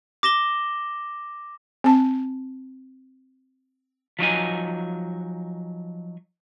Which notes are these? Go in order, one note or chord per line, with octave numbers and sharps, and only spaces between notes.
D6 A#6 E7 G7
C4 A5
F3 F#3 D#4 G#5